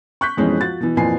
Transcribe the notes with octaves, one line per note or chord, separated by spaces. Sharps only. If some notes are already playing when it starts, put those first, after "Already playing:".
C#6 F#6 G6 B6
F2 B2 E3 G#3 C4 C#4
F3 F#4 A6
B2 E3
F2 A#2 E3 B4 G#5 C7